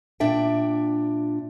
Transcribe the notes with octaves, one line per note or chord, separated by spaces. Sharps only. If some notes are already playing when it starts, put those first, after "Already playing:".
A#2 D4 E5 G5